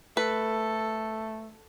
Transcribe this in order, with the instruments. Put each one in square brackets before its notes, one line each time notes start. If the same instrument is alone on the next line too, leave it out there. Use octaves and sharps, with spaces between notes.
[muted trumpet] A3 [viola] A4 [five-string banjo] B4